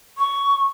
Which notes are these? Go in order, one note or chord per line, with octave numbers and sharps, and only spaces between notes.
C#6